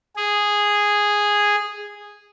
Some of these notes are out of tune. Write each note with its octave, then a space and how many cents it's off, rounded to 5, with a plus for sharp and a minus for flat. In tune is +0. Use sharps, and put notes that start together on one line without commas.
G#4 -5